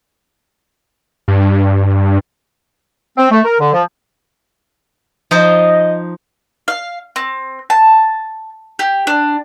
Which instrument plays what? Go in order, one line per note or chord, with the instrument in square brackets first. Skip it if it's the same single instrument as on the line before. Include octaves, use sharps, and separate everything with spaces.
[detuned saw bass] G2
[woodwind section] C4
A3
A#4
D3
F3
[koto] F3 D#4 C5 [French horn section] D#5
[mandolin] F5
C4
A5
G4
D4